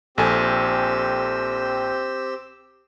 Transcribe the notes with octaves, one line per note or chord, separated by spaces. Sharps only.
A#1 C4 G4 A4 G#5 E6